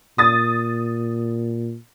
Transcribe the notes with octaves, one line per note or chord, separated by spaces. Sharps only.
A#2 D#6 A6